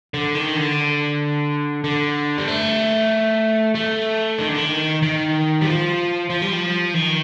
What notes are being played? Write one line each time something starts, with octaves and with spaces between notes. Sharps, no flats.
D3
D#3
D3
D3
G3
A3
A3
D#3
D3
D#3
D#3
G3
F3
F3
G3
F3
D#3